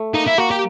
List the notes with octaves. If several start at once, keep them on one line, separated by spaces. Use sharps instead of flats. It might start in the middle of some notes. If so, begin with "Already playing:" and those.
Already playing: A3
A#3 D#4
E4
A#3 F#4
G4